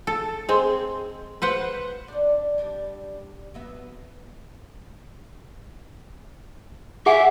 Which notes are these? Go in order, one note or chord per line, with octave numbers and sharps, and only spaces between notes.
A4
G#3 C4
B4 C5 F#5
D4 D5
G3 D4 G4
F#3 B3 E5
G#4 E5 F#5 G#5